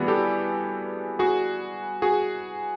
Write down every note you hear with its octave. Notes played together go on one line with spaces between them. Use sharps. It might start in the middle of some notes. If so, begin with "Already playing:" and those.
Already playing: E3 G3 B3 F#4 G#4
G4 A4
F#4 G#4
F#4 G#4